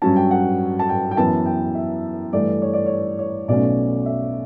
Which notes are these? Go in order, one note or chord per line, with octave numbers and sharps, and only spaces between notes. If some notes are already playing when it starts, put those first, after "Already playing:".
G2 F#3 C#4 A5
G5
F#5
A5
G5
G5
F#2 E3 B3 A5
G5
E5
G2 E3 A3 D5
C#5
D5
C#5
C#5
B1 B2 A3 C#4 D5
E5